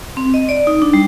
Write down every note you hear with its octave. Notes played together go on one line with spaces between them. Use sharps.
C4
D#5
D5
D#4
D4
G3